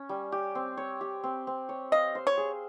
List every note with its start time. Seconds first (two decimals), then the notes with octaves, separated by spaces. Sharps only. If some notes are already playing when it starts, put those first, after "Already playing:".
Already playing: C#4
0.09 G3
0.32 G4
0.55 C4
0.77 C#5
1.01 G4
1.24 C4
1.47 C4
1.69 C#5
1.92 D#5 F5
2.15 C5
2.27 C#5
2.37 G#4